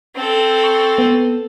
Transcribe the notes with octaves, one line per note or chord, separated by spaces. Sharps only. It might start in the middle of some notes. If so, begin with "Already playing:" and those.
C4 A4
C#6
B3